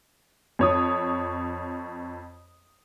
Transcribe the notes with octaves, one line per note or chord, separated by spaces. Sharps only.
F2 C#5 D#6